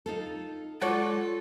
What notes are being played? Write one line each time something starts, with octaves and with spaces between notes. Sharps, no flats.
D#4 F4 A4
G#3 F4 F#4 A4 C#5 D5